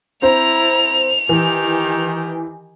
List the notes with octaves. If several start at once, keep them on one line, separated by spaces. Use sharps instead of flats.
C4 E4 C5 A#5 F7
D#3 E3 G4